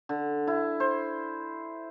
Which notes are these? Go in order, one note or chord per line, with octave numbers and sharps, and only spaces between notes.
D3
E4
C5